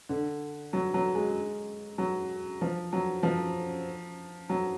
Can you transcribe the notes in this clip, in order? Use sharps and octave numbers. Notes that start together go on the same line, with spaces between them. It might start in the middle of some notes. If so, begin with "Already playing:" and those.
D3
F#3
F#3
G#3
F#3
F3
F#3
F3
F#3